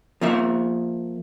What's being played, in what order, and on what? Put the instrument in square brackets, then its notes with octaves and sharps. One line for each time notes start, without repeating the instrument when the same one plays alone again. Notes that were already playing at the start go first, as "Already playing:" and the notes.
[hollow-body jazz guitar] F3 A#3 E5